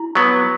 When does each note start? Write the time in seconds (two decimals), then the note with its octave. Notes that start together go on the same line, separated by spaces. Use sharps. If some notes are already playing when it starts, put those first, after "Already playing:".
Already playing: E4
0.15 F#3 B3